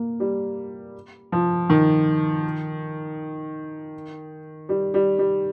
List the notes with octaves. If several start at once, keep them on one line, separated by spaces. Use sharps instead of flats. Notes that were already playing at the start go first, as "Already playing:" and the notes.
Already playing: A#3
G3
F3
D#3
G3
G3
G3